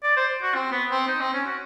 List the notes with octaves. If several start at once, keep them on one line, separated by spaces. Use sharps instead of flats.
D5
C5
F#4
C4
B3
C4
D#4
C4
C#4
F#4